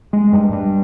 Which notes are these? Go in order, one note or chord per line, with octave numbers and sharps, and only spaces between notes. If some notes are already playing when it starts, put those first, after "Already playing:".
G#3
G2
G2